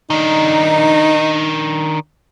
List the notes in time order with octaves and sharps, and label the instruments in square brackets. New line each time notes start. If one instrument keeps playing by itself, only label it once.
[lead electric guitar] D#3 D4 [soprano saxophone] D#4